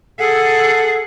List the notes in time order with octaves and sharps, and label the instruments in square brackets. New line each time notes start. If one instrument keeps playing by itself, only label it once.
[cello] G#4 F#5 [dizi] A4